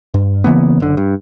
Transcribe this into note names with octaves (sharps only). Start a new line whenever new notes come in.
G2
C#3 E3 A#3 B3
F#1 D3
G2